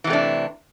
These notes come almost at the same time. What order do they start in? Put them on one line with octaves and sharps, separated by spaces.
E3 C3 A3 D4